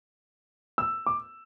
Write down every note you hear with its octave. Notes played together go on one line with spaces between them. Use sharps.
E6
D6